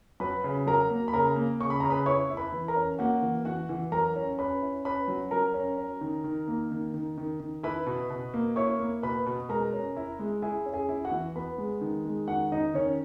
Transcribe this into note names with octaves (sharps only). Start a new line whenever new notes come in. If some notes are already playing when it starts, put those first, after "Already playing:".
F#3 B4 B5
C#3
F#3 A#4 A#5
A#3
B5
C#3 A#4 A#5
A#3
C#3 C#6
B5
C#3 A#5
B4 B5
E4 C#5 C#6
E4
B4 B5
E3
A#4 A#5
C#4
A#3 F#4 F#5
E3
E3 F#4 F#5
E3
F#3 A#4 A#5
C#4
C#4 B4 B5
E4
C#4 B4 B5
F#3
F#3 A#4 A#5
C#4
C#4
D#3
D#3
A#3
D#3
D#3
D#3
D#3
E4 B4 B5
B2
B2
A#3
E4 C#5 C#6
A#3
B2 B4 B5
B2
G#3 A#4 A#5
C#4
E4
G#3
E4 G#4 G#5
C#4
G#4 G#5
E4
F#4 F#5
E3
B3 B4 B5
G#3
D#3
G#3
D#3 F#4 F#5
D#3 D#4 D#5
D#3 C#4 C#5